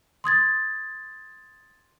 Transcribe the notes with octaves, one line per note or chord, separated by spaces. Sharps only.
C6 D#6 G#6 A6